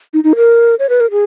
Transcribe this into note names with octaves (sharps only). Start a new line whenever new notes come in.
D#4
D#4
A#4
C#5
B4
A#4
G#4